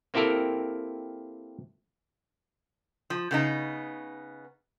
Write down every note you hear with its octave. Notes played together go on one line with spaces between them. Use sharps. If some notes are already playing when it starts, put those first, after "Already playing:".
A#3 C4 E4 G4 A4 A#4
F3
C#3 B3 D#4